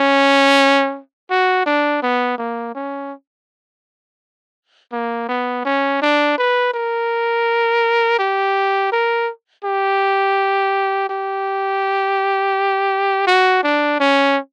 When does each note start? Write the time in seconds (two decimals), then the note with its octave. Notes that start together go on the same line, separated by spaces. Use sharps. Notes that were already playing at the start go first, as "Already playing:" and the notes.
Already playing: C#4
1.31 F#4
1.66 D4
2.03 B3
2.38 A#3
2.75 C#4
4.93 A#3
5.29 B3
5.65 C#4
6.02 D4
6.38 B4
6.74 A#4
8.19 G4
8.92 A#4
9.65 G4
11.10 G4
13.27 F#4
13.64 D4
14.00 C#4